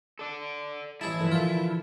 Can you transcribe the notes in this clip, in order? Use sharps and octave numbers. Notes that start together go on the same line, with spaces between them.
A4 D5
A1 E4 G#4 A5
D3 E3 F3
A#2 F4